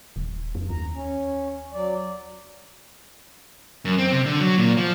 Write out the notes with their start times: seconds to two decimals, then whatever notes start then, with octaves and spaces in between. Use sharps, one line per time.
0.16 D#1
0.55 F2
0.70 D#2 A#5
0.94 C#4
1.73 F#3 D5
3.85 F#2
3.98 C4
4.12 C3
4.26 D3
4.40 F#3
4.58 A#2
4.77 F3